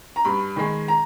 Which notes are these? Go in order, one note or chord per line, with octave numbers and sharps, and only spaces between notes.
A#5
G2 B5
D#3 G#3
A#5